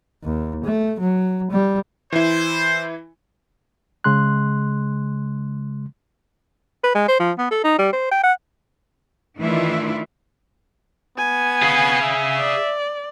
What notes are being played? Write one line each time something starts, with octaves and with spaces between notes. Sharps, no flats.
D#2
A3
F#3
G3
E3 E4 C5
C#3 G#3 C6 F#6
B4
G#3
C5
F3
B3
A4
D#4
G3
C5
G5
F#5
D#3 E3 A3 D4 E4 F4
B3 G#5
G#4 F5
E5
D5